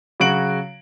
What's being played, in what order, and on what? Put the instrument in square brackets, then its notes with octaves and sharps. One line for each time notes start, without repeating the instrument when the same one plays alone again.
[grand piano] C#3 F#3 F#4 D7 F#7